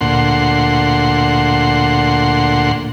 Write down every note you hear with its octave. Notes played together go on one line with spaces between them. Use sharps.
D2 A#2 F#5 C6